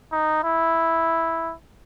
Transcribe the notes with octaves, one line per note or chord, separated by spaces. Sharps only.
D#4
E4